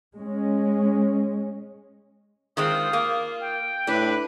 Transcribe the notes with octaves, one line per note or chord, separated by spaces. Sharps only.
G#3 C#4
D#3 G#3 C4 F4 D#6
A#3
G5
A2 D4 B4